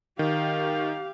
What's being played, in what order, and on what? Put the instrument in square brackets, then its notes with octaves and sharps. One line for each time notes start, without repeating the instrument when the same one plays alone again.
[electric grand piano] D#3 [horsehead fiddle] G4 F5